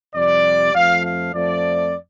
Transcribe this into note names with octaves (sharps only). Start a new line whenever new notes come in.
F2 C3 G3 D5
F2 F3 A3 F5
F5
F2 F3 A3 D5